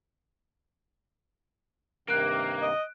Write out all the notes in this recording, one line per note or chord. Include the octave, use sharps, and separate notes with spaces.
G2 C3 D#3 A#3 F#6 D7
D#5